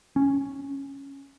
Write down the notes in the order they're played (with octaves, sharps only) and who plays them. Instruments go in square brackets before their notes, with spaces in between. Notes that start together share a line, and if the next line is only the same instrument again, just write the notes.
[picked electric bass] C#4